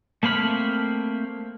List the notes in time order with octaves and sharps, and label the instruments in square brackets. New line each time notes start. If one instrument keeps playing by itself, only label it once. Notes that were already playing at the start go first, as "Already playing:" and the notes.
[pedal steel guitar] A3 A#3 C4 B5 F6